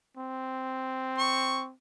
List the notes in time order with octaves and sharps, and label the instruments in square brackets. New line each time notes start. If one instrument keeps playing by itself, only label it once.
[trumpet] C4
[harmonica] C#6